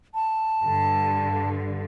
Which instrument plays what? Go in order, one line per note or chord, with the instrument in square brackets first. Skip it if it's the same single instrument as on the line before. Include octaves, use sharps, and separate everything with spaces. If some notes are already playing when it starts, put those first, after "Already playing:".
[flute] A5
[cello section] G2 D3